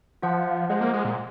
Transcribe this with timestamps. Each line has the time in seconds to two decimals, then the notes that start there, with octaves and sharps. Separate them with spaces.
0.22 F3 F4 C5 D#5 F#5
0.69 G#3 F4 C5 D#5 F#5
0.81 A#3
0.93 G#3
1.05 A#2